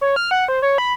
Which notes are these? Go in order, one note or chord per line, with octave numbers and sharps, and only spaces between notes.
C#5
F6
F#5
C5
C#5
B5